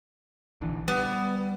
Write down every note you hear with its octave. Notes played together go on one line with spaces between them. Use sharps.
A#1 D3 E3
G3 B3